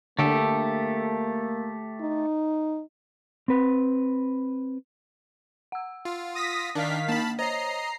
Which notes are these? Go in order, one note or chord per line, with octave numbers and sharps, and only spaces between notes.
D3 A3 A#3 G4 A4
D#4
C4 B4
F#5 E6
F4
D#6 A#6 B6
D#3 D4 F5 B6
A#3 A5 B5
C5 C#5 D#5 A#5 C7